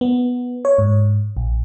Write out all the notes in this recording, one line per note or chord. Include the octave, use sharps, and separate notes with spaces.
B3
C#5
G#2
A#1